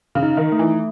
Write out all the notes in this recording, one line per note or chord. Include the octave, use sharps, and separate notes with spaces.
C#3
D#4
D#3
A3
E3